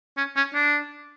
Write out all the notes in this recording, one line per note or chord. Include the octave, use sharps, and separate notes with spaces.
C#4
C#4
D4